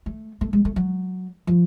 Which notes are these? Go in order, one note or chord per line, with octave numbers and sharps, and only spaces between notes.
A3
A3
G#3
A3
F#3
F3